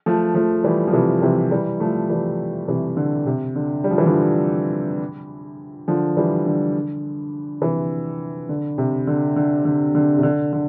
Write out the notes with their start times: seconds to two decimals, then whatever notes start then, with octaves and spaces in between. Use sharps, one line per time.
0.06 F3 A3
0.35 F3 A3
0.64 E3 G3
0.88 F3
0.93 C3 E3
1.22 C3 E3
1.51 E3 G3
1.80 F3 A3
2.10 E3 G3
2.68 C3 E3
2.97 D3
3.26 C3
3.56 D3
3.84 G3
3.91 F3
3.98 E3
4.06 D3 F3
5.88 D3 F3
6.17 E3 G3
6.46 D3
7.62 C3 E3
8.49 D3
8.78 C3
9.07 D3
9.36 D3
9.65 D3
9.95 D3
10.18 C3
10.23 D3
10.53 D3